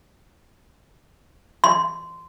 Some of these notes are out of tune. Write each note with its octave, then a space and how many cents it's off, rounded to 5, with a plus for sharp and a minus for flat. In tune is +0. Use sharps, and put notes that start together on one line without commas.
C6 -15